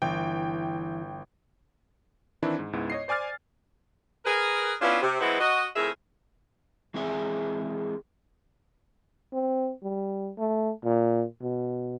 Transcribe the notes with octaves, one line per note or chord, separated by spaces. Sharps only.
G1 E3 G5
D#3 E3 C4 D4 E4
G#2
C#2 G#2 B3 E4
C#5 D#5 C7
C5 D5 G#5 D6 F6 A6
G#4 A#4 B4
B3 C#4 D4 E4 F4
C3
E3 F#3 G#3 B3 C4 E4
F#4 D#5
F2 A2 G#4 A#4 E5
E3 G#3 C4 G#4 E5 G#5
C4
G3
A3
A#2
B2